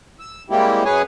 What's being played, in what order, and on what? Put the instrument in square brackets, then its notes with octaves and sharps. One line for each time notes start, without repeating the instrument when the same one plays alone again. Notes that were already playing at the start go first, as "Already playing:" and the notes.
[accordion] E6
G3 G#3 A#3 C4 E4 G4
F#2 F#3 G#4 B4 C#5 G#5